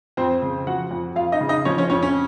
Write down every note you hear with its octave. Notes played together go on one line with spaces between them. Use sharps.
F2 C4 C5
C#3
F3 F#4 F#5
F2
F2 F4 F5
D#4 D#5
C#3
D#4 D#5
F3 C#4 C#5
C#4 C#5
F2 C#4 C#5
C#4 C#5